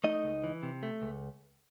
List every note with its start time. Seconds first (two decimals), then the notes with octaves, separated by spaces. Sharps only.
0.04 A3 D#4 D#5
0.24 C#2
0.44 E3
0.63 C3
0.83 A3
1.02 C#2